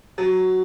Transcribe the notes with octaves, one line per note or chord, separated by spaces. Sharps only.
F#3